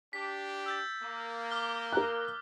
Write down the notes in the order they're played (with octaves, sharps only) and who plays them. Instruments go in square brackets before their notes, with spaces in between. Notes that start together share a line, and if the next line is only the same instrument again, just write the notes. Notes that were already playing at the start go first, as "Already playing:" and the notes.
[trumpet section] D4 G4 [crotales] B6
[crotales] E6 G6 A6
[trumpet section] A#3
[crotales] D6 F6 G7
[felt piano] A#4 A#5 F#6